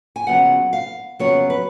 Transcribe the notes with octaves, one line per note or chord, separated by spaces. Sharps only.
G#5
F2 C#3 F#3 B3 F#5
F5
F2 C#3 F#3 B3 C#5
B4